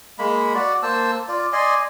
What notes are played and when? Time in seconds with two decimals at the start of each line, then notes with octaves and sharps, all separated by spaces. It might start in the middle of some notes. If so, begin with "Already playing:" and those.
0.19 G#3 A#3 B5
0.55 F#4 D5
0.83 A#3 C5 A5 E6
1.29 F4 D5
1.53 D5 D#5 G#5 C6